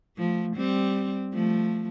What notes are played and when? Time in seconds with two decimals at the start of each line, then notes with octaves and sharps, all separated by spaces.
0.17 F3 A3
0.56 G3 C4
1.34 F3 A3